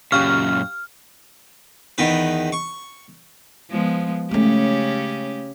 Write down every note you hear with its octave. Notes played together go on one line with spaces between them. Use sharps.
F#2 A#2 C#3 G4 F5 C#6 F6
E2 D#3 B4
C#6
F3 G#3 B3
C#3 G#3 A3 C#4 G4